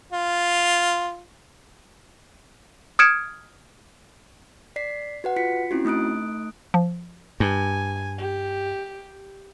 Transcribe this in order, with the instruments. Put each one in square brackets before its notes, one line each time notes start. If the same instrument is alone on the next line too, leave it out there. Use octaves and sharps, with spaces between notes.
[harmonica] F4
[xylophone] D#6 F6 G#6 C#7 D7 E7
[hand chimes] D5 B6 C7
F#4 B4 F#5
F4 B6 C#7
C4 C#4 E4 F#4
A3 D#4 D#6 F#6 D7
[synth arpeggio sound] F3
[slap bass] G2 [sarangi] G#5
[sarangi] G4